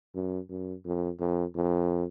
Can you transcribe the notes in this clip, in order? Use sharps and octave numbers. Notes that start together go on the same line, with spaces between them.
F#2
F#2
F2
F2
F2